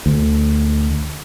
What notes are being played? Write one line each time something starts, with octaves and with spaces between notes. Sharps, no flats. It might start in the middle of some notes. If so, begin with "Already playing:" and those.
D2